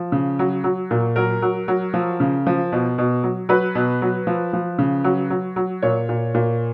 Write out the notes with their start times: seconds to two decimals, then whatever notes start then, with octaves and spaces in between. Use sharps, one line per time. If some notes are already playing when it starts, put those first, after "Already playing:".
Already playing: F3
0.12 C#3
0.39 F#3
0.64 F#3
0.91 A#2
1.16 F#3 A#4
1.42 F#3
1.68 F#3
1.94 F3
2.20 C#3
2.46 F3
2.72 B2
2.98 B2
3.23 F#3
3.49 F#3 B4
3.75 B2
4.02 F#3
4.27 F3
4.53 F3
4.78 C#3
5.04 F#3
5.30 F#3
5.56 F#3
5.82 A#2 C#5
6.09 A#2
6.34 A#2